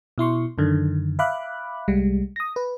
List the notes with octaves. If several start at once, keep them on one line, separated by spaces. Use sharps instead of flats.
B2 E4 C6 C#6
F#2 D3 D#3
E5 F5 B5 D6 F#6
C2 G3 G#3
D#6 A#6
B4